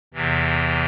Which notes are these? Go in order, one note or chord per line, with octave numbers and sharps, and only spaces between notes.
E2 C3 E3